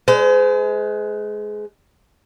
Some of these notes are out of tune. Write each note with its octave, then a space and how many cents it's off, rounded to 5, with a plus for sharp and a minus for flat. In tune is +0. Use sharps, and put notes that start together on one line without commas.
G#3 +20 C5 -40